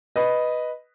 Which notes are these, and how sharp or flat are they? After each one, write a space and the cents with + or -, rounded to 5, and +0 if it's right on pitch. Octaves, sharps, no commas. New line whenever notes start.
B4 +0 D#5 +0